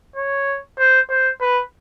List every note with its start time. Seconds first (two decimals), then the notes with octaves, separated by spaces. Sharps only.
0.16 C#5
0.79 C5
1.10 C5
1.41 B4